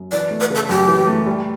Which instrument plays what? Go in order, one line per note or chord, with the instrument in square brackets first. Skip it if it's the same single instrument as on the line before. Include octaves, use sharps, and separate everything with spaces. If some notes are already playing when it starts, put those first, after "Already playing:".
Already playing: [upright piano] F#2
[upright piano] E3 [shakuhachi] D5
[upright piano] A3
[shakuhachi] B4
[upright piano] C#3 [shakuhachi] A4
[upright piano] F#2 [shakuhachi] G4
[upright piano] E3
A3
G3